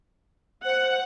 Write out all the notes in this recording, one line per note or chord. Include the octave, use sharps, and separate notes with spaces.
C5 F#5